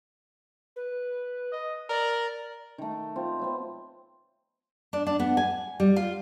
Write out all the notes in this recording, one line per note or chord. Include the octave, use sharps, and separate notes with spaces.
B4
D#5
A#4 D5
D#3 A3
C4 F4
F#3 B3 C4
D4
D4
B3
G#5
G3
F4